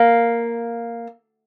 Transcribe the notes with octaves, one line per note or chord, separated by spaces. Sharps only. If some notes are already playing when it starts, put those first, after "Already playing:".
Already playing: A#3